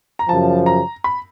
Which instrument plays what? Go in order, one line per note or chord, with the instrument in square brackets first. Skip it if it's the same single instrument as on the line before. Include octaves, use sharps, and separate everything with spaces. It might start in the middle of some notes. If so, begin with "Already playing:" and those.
[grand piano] A#5
[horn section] F#2 C#3 F3 [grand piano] A5
[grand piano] A#5
B5